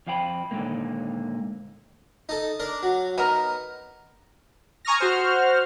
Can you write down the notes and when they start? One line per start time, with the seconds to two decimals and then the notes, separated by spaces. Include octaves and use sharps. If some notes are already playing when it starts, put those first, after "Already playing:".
0.07 F2 F3 F5 G5 B5
0.51 A#2 D3 D#3 F#3 G#3 A#3
2.29 D#4 A4
2.59 D4 A#4
2.83 F#3
3.18 B3 D#4 A#4
4.85 G#5 A#5 C#6 D#6 F6 A#6
4.98 F#4 C5 F6